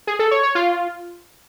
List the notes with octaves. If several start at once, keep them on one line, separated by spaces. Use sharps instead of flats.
G#4
A4
C#5
C#5
F4